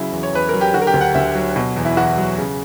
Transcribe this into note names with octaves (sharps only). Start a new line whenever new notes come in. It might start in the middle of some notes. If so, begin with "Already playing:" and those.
Already playing: C#3 F#3 E4
E2
C#5
E2 B4
F#3 A#4
G4
D3 F#4
A#4
G4
D2
F#5
D2 E5
F#3
B2
E2
E4
E2 F#4
F#3
C#3